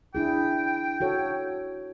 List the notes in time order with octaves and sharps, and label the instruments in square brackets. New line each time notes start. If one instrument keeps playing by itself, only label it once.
[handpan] D4 E4 G#4 [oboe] G5
[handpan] F#4 A4 C#5